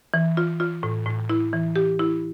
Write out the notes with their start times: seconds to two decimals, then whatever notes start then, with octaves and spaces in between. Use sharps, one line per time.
0.14 E3
0.37 F4
0.60 F4
0.83 A2
1.06 A2
1.29 E4
1.53 E3
1.76 G4
1.99 E4